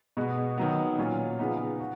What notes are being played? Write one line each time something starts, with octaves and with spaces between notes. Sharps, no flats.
B2 G#3 B3 F#4
D#3 F#3 B3
A#2 F#3 C#4 F4
C#3 F3 G#3 B3 D#4
F#4